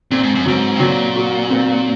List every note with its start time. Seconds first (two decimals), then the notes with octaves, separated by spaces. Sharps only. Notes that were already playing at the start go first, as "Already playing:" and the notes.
0.11 A#2 C4
0.23 G#2
0.35 F#2
0.46 G#2 F#3
0.76 C3
0.80 A#2 F#3
1.16 F#4
1.50 C4